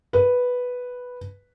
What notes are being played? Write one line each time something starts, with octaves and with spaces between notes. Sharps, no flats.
B4